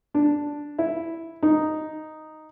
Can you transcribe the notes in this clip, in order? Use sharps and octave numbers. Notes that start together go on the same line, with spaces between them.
D4
E4
D#4